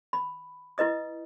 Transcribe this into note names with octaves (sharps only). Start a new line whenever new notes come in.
B5
E4 B4 D#5 D#6